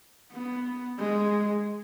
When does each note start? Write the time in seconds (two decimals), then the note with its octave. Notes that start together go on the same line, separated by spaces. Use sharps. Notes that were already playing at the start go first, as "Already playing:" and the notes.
0.32 B3
0.99 G#3